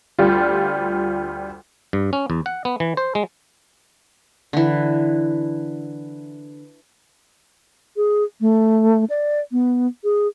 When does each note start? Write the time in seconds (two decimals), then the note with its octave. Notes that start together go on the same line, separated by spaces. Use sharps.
0.19 D2 G3 F4
1.93 G2
2.13 C#4
2.30 E2
2.46 F#5
2.65 B3
2.80 E3
2.97 C5
3.15 G#3
4.53 D3 E3
7.97 G#4
8.41 A3
9.10 D5
9.52 B3
10.04 G#4